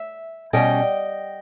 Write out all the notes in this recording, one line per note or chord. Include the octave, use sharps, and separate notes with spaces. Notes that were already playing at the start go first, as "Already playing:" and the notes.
Already playing: E5
B2 G3 C#4 D#5 G5